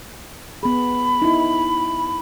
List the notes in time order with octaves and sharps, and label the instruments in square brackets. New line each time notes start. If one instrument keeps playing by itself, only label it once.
[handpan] B3 G#4 [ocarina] B5
[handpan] D#4 E4